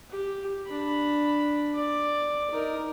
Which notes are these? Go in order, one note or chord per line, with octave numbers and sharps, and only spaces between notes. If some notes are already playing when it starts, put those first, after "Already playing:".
G4
D4 B5
D5 D6
D#4 A#4